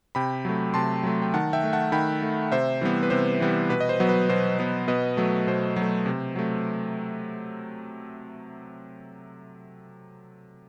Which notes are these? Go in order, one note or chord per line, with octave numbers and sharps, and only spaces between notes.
C3 G5 B5
F#3 A3
C3 A5 C6
F#3 A3
G5
D#3 F#5 A5
E5 G5
A3
F#5 A5
D#3 G5 B5
A3
C3 C5 E5
E3 G3 B3
B4
C3 C5
E3 G3 B3
B2 B4
D#5
C5
F#3 B3
B4
B2 C5
F#3 B3
B2 B4 D#5
F#3 A3
B2 C5
F#3
A3
C3
F#3 A3